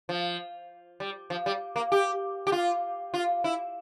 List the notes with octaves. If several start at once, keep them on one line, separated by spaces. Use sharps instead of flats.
F3
G3
F3
G3
A#3
G4
G4
F4
F4
E4